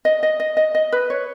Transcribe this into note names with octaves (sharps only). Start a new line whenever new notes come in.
D#5
D#5
D#5
D#5
D#5
B4
C#5